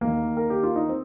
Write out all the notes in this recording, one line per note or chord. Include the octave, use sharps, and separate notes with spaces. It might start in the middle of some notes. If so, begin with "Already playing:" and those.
D#2 D#3 A#3
A#4
G4
F4
D#4
C4